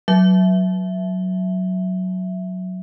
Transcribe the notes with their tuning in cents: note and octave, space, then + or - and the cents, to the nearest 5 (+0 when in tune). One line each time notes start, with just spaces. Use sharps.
F#3 +0 E5 +0